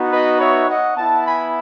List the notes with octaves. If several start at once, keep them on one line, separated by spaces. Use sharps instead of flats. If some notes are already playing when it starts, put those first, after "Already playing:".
Already playing: B3 D#4 F#4
B4 D#5
C#5 E5
D#5 F#5
B3 E4 F#5 A5
G#5 B5